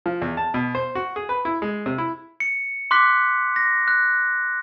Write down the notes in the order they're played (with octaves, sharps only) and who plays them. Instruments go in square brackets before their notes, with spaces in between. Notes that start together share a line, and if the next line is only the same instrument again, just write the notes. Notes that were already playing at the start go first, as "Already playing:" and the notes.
[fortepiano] F3
E2
A5
B2
C5
F#4
G#4
B4
E4
G#3
C3
E4
[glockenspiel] C#7
C6 D6 F#6 B6
A#6
F#6